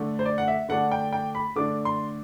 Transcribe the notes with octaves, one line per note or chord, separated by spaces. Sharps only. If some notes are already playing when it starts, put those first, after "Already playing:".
Already playing: D3 A3 D4
C5
D5
F#5
E5
D3 A3 D4 F#5
G5
G5
B5
D3 A3 D4 D6
C6